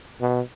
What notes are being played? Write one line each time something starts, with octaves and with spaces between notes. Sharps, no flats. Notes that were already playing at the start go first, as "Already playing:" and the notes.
B2